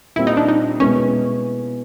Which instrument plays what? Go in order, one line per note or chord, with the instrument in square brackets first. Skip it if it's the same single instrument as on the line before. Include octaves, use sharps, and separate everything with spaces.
[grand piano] A#2 G3 C4 [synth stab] E4
[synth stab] D#4
D4
D#4
[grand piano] B2 G#3 B3 E4 [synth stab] C#4